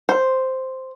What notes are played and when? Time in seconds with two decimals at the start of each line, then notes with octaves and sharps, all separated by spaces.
0.09 C5